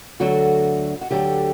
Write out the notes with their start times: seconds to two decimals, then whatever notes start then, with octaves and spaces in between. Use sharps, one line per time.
0.20 D2 D3 F#3 A3 F#4
1.01 F#4
1.10 D2 D3 F#3 A3 G4